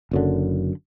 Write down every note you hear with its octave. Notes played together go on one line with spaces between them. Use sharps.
F#1 F#2 D3